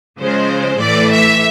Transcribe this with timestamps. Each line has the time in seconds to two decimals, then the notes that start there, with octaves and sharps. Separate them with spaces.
0.20 C#3 F3 G#3 C5
0.80 A2 E3 A3 D5
1.11 E5